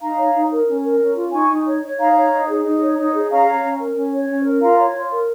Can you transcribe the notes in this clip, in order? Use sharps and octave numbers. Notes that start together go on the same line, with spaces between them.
D#4 F5 A#5
C#5
D#4
A#4
C#4
A#4
C#4
F4
D#4 G#5 C#6
D#4
C#5
C#5
D#4 F5 A#5
C#5
D#4
G#4
D#4
C#5
D#4
G#4
C#4 F5 A#5
C#5
C#4
A#4
C#4
C#5
C#4
A#4
F4 F5 A#5
C#5
F4
A#4